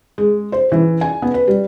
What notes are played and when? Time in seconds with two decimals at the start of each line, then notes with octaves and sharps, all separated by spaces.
0.18 G#3
0.52 C5
0.72 E3
1.01 G#5
1.22 B3
1.34 B4
1.48 G3